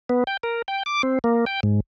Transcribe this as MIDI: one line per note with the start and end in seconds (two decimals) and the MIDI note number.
0.09 0.24 59
0.27 0.37 79
0.43 0.62 70
0.68 0.83 79
0.86 1.02 86
1.03 1.19 60
1.24 1.45 58
1.46 1.60 79
1.63 1.80 44